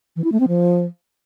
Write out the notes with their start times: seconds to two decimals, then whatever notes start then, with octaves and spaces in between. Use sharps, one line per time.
0.16 E3
0.24 E4
0.32 A3
0.40 C4
0.48 F3